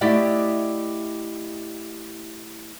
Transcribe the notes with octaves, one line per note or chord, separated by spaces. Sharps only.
A3 E4 G4 D5 D#5 F#5